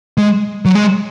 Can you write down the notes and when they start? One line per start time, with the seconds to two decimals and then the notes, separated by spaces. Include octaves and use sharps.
0.18 G#3
0.65 F#3
0.75 G#3